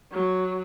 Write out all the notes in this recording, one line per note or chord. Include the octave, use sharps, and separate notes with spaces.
F#3